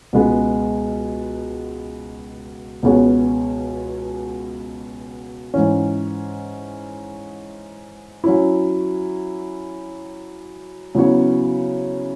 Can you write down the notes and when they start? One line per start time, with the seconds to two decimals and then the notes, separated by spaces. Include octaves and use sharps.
0.13 C#2 B2 G#3 B3 G#4
2.83 C#2 B2 B3 G#4 C#5
5.54 G#2 E3 C#4
8.24 F#3 C#4 E4
10.95 C#3 F#3 B3 E4 C#5